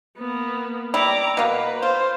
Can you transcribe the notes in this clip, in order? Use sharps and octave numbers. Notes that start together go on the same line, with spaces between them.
A#3 B3
G3 E4 A#5 D6
B2 A#3 B4
F4 C5